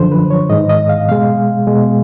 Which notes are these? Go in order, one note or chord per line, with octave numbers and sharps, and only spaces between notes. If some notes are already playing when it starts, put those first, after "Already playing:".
Already playing: F#2 D3 F3 C5
B4
C#5
G#2 D#3 G#3 D#5
D#5
F5
B2 G#3 F5
B2 G#3